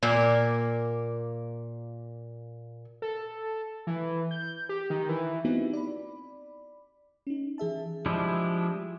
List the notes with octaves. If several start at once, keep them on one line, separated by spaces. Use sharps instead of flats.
A#2 A#3
A4
E3
G6
G4
D#3
E3
B3 C4 D#4 E4 F#4 G4
D5 B5
C#4 D#4
E3 G#4 E5 A5
F3 G3 G#3 D4 E4